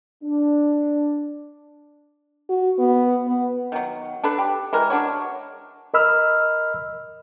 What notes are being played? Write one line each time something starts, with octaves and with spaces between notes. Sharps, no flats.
D4
F#4
B3
B3
D#3 F#3
D4 A4 B4
G4
E3 G#3 A#4
D4 F#4 C#5
A#4 D#5 B5 E6 F6